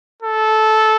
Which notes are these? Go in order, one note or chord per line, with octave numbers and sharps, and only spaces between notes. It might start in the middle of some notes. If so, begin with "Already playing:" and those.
A4